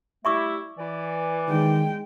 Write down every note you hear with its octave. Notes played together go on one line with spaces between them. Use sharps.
G3 A3 E4 E5 C#6 D6
E3 D5
D#3 G#3 G5